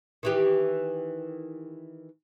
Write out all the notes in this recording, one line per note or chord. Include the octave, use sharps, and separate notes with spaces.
D#3 E3 G4